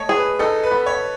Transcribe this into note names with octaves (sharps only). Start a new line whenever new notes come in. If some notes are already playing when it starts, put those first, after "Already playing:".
Already playing: A3 C#5 D#5
G#4
B4
D#4 A4
B4
B3
C#5